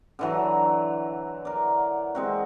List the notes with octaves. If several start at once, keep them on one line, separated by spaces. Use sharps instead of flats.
D3 E3 F#3
A#4 D5
G#3 C4 F#4